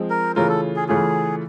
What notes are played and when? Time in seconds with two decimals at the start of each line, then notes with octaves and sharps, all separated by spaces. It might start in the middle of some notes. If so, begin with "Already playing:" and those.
Already playing: F3 G#3 C4
0.10 A#4
0.36 C#3 E3 A3 C#4 F4 A#4
0.49 A4
0.76 G#4
0.88 C#3 E3 A3 C#4 F4 G#4